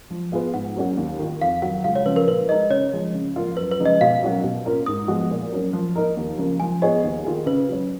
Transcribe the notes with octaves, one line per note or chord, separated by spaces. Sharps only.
F3
B3 F4 G#4 B4
G#2 F#5
F#3 A#3 C#4 F#4
D#2
D#3 A#3 F4
F2 F5
D#3 F#3 F#5
C#2 F5
C#5
C#3 F3 B4
A#4
A#2 B4
G#3 D#4 A#4 D#5
C#3 C#5
F3 G#3
C#3
F3 A#3 F4
F#2 B4
B4
C#3 F3 G#3 D#4
D#5
B2 F5
F#3 C#4 F#4 A#4
B2
A#3 C#4 F4 A#4
G#2 D#6
F3 G#3 B3 F#4
A#2
F#3 A#3 C#4
F3
A#3 D#4 A#4
D#2
C#3 F3 A#3
F3 G#5
B3 F4 G#4 C#5 D#5
D#2
D#3 A#3 F4 G#4
C#3 B4
F#3 C#4